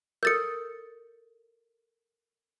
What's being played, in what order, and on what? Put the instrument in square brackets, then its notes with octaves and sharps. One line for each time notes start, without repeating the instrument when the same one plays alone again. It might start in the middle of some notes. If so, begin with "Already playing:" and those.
[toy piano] A4 A#4 [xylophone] G6 A6 C#7